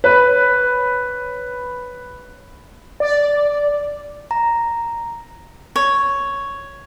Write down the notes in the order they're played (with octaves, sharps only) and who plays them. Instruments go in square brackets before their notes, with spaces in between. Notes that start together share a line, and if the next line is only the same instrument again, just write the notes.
[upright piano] B4 C#5
[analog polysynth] D5
[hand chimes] A#5
[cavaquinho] C#5